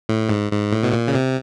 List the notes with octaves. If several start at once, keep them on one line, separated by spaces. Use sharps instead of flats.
A2
G#2
G#2
A2
B2
A#2
C#3
C3